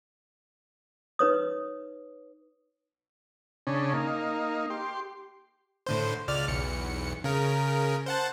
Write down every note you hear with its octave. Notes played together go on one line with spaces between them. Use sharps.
D#4 B4 C#5 D#6
C#3 C#4 D4
A#3 D#4
G4 C6
A2 D3 C5
C#2 D5 F6
B1 E2 C#7
C#3 A#4
C5 F#5 A5